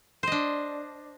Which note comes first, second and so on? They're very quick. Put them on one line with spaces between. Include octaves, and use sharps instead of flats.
C5 D#5 D4